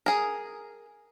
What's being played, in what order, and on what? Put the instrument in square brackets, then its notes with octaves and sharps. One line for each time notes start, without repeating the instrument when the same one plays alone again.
[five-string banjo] G#4 A#4